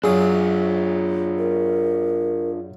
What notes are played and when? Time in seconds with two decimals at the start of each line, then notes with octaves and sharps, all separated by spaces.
0.04 F#2 F#3 D4 F4 G#4 D#6
1.38 A#4